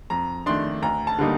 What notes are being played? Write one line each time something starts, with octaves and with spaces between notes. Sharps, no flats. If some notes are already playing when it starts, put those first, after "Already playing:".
F2 A#5
D#3 A3 D4 C6
D2 A#5
A5
D3 G3 A#3 D#4